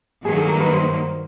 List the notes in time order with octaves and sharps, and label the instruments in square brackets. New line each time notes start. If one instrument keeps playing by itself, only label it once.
[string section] G2 D#3 F#3 A#3 [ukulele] G#4
[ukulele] A4
A#4
B4
C5